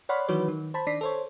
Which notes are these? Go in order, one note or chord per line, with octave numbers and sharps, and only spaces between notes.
C#5 D5 F#5 B5 C6 F6
D#3 E3 F#3 F#4 B4 C#5
D#3
C5 A5 B5
D#3 D4 D5 B6 C7
A4 C5 C#5